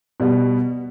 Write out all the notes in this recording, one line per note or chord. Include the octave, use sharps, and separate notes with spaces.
B2 G3 B3